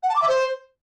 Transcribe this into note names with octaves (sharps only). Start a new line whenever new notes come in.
F#5
A5
D6
E5
C5